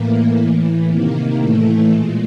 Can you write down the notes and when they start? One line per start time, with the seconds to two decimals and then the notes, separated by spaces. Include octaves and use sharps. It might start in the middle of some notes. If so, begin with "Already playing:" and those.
Already playing: A2 E3 A#3
0.38 A2 E3
0.88 C3 D#3 A#3
1.40 A2 E3 A3
1.91 A#2 G#3